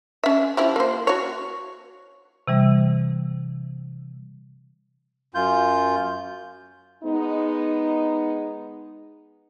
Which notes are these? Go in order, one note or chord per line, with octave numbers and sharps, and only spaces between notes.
C#4 E5
F3 E4 G4
A#3 C5
F#4 C#5
C3 E3 G3
F#2 F4 G6
G#3 B3 D#4